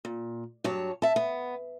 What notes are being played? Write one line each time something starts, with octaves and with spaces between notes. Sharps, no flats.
A#2
G2 F#3 C#5 A5
E5 A5
B3